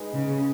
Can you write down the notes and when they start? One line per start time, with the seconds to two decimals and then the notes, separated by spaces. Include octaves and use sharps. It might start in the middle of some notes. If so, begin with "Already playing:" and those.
Already playing: G#3 D#4 G#4 B4
0.13 C#3